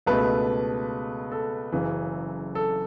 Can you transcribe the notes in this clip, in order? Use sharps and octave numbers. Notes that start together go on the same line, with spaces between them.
C#2 B2 A3 B4
A4
F#1 F#2 C#3 E3
A4